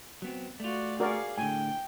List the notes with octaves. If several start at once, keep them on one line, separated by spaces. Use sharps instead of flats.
F#3 B3 C4
A3 F4 F#4 D5
F#4 G#4 A#4 D5 F5
A2 D3 G5 G#5